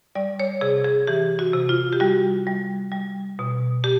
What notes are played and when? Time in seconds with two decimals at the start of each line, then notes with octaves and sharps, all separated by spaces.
0.15 G3 D5
0.40 C#5
0.61 C3 G#4
0.84 G#4
1.07 E3 G4
1.39 F#4
1.53 C3
1.69 F4
1.93 G4
2.00 G3 F#4
2.47 G3
2.92 G3
3.39 B2
3.84 G4